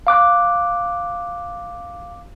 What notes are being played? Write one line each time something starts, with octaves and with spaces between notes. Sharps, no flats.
F5 D6 F#6